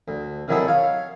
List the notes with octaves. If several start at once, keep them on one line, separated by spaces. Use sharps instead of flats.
D2
C3 D#3 F#3 E4 G#4 A4
C#5 F5